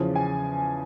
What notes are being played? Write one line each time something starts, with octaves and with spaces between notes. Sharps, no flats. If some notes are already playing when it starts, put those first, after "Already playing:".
Already playing: E2 C#3 F3
G#5